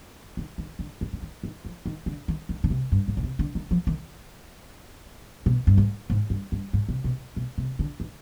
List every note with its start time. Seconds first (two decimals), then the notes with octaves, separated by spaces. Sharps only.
0.37 D#3
0.58 D#3
0.79 D3
1.01 D#3
1.13 D3
1.22 D#3
1.44 D#3
1.65 F3
1.86 D#3
2.06 D3
2.28 D#3
2.49 D#3
2.64 D3
2.70 C3
2.92 G2
3.08 G#2
3.17 B2
3.23 C3
3.39 D3
3.55 D#3
3.71 F3
3.87 D#3
5.46 B2
5.67 G2
5.78 G#2
6.10 G#2
6.30 G2
6.52 G2
6.73 G#2
6.89 C3
7.04 B2
7.36 B2
7.58 C3
7.79 D3
8.00 D#3